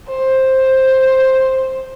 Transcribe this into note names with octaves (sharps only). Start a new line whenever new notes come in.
C5